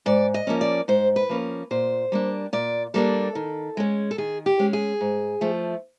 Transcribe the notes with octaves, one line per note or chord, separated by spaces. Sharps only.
G#2 D5
D#5
F3 A#3 C#4
D5
G#2 C5
B4
F3 A#3 C#4
A#2 C5
G3 A#3 D4
A#2 D5
G3 A#3 D4 A4
D#3
G#3 C#4
A4
D#3 G#4
G4
G#3 C#4
G#4
G#2
F3 A3